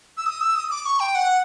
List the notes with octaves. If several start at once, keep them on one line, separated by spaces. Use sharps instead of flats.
E6
D#6
E6
D#6
D6
C#6
G5
F#5